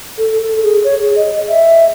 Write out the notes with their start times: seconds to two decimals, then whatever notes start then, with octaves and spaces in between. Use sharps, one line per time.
0.18 A4
0.41 A4
0.63 G#4
0.84 C#5
1.00 G#4
1.16 D#5
1.48 E5